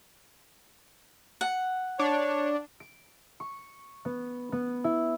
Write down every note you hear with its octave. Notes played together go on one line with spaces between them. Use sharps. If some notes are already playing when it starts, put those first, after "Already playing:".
F#5
D4 C#5
D7
C#6
B3
B3
E4